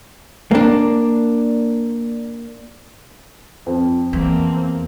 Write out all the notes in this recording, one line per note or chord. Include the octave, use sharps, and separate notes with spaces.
A#3 D4
F2
E2 A#3 C4